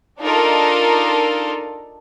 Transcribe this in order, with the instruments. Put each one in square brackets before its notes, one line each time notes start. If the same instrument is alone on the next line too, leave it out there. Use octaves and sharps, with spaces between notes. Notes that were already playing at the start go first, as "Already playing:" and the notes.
[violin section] D4 D#4 F4 A4 A#4